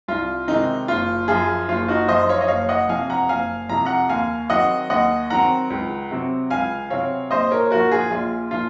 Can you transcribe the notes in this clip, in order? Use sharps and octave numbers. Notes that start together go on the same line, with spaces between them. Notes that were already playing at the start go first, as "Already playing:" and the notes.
C2 F4
C3 D#3 G#3 C4 D#4
F#1 F4
F#2 F3 F4 G#4
F#1 F4
D#4 F#4
F#2 F3 C5 D#5
C#5 F5
D#5
F#1 C#5 F5
D#5 F#5
F2 C3 F3 F5 G#5
F#5 A#5
F#1 F5 G#5
F2 C3 F3 A#5
F#5 A#5
D#2 F5 G#5
D#3 F#3 C4 D#5 F#5
D#2 D#5 F#5
D#3 F#3 C4 F#5 A#5
C#2
C3 F#3 C4
C#2 F5 G#5
C3 F#3 C4 C#5 F5
A#1 C5 D#5
A#4 C#5
A#2 F3 F#4 A#4
F4 G#4
A#1 F4
A#2 F3 F4